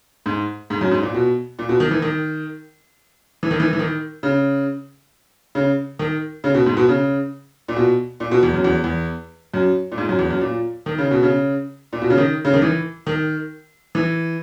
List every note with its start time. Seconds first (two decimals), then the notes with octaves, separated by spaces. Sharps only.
0.26 G#2
0.70 G#2
0.81 F#2
0.91 G#2
1.03 A#2
1.14 B2
1.59 A#2
1.69 B2
1.80 D#3
1.91 E3
2.02 D#3
3.43 E3
3.51 D#3
3.60 E3
3.73 E3
3.79 D#3
4.23 C#3
5.55 C#3
5.99 D#3
6.44 C#3
6.55 B2
6.66 G#2
6.77 B2
6.89 C#3
7.68 A#2
7.76 B2
8.20 A#2
8.31 B2
8.43 E2
8.54 F#2
8.64 E2
8.84 E2
9.54 F#2
9.92 A#2
9.98 G#2
10.09 F#2
10.19 E2
10.30 F#2
10.41 A#2
10.86 D#3
10.98 C#3
11.11 B2
11.23 C#3
11.93 A#2
12.02 B2
12.10 C#3
12.18 D#3
12.45 C#3
12.54 D#3
12.62 E3
13.07 D#3
13.95 E3